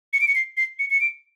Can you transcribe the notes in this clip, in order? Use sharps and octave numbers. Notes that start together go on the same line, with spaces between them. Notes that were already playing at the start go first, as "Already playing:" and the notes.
C#7
D7
C#7
C7
C7
C#7
C#7
D7